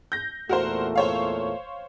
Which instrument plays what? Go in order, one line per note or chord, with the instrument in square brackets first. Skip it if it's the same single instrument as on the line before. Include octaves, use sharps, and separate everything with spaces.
[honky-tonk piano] G6 A#6
[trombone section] E2 A#2 A3 [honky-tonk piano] F#4 A#4 C5
[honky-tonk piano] C5 C#5 F5